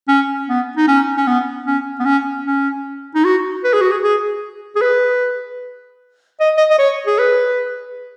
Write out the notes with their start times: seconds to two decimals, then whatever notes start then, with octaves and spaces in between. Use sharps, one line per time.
0.08 C#4
0.49 B3
0.77 D#4
0.88 C#4
1.17 C#4
1.27 B3
1.66 C#4
1.99 B3
2.05 C#4
2.46 C#4
3.15 D#4
3.24 F#4
3.64 B4
3.73 G#4
3.81 F#4
3.91 G#4
4.04 G#4
4.76 G#4
4.81 B4
6.40 D#5
6.57 D#5
6.70 D#5
6.79 C#5
7.07 G#4
7.19 B4